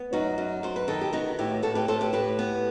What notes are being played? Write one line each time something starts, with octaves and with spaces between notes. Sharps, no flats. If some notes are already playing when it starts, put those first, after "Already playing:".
Already playing: B3
F#2 D#4 F#4
F#2
F#2 C5
B4
D#3 A4
G4
B3 D#4 F#4
A2 E4 G4
A2 F#4 A4
G4 B4
A2 A4 C5
G4 B4
A2 G4 B4
B3